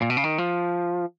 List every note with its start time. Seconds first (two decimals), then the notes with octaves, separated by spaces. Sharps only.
0.02 A#2
0.10 B2
0.17 C#3
0.24 D#3
0.38 F3